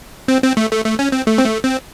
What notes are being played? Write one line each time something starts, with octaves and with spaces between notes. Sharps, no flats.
C4
C4
A3
A3
A3
C#4
C4
A3
C4
A3
C4